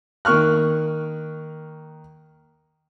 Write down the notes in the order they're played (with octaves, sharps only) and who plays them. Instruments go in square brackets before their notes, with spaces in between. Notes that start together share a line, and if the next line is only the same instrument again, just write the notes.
[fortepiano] D#3 A#3 C#6 F6 F#6